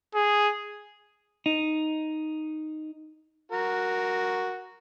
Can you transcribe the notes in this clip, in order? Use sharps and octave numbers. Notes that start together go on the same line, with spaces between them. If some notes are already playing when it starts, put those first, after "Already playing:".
G#4
D#4
F#4 A#4